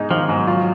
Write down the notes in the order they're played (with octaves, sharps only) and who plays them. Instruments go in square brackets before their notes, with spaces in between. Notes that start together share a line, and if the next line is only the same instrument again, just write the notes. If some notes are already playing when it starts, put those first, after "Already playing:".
Already playing: [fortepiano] G#2 G#3 D#4
[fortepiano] D#3 [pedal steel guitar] F3
[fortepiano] G#2 [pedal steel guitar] F#3
[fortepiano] F4